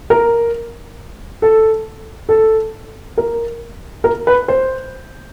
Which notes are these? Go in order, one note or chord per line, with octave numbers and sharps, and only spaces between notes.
A#4
A4
A4
A#4
A#4
B4
C5